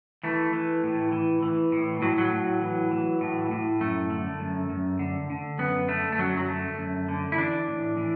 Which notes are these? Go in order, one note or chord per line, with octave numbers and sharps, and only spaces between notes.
E3 A3
E3
A2
E3
E3
A2
A2 F#3
F#3
A2
E3
E3
A2
A2
F#2 A3
D3
F#2
F#2
D3
D3
F#2 B3
D3 A3
A3
F#2 F#3
F#3
D3 A3
F#2
D3
E4
E3 D4
A2
E3